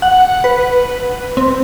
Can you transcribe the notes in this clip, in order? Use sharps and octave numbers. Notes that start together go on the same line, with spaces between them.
F#5
B4
C4